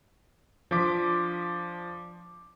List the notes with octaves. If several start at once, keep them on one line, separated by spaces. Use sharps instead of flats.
F3 D4 C6 D6 B6